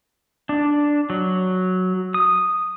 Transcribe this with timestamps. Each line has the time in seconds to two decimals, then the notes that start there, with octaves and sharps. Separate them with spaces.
0.49 D4
1.10 F#3
2.14 D#6